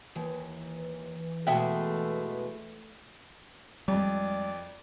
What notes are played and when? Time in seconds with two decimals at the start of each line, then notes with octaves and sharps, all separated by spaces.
0.16 D#2 E3
1.47 E2 B2 G#3 A3 A4 E5 G5
3.88 F2 G3 G#3 D5